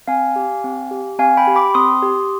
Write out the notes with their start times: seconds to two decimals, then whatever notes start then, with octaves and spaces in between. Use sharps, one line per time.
0.08 C4 F5 G#5
0.36 G4
0.64 C4
0.91 G4
1.19 C4 F5 G#5
1.37 G5 B5
1.47 G4
1.56 B5 D6
1.74 C4 C6 D#6
2.02 G4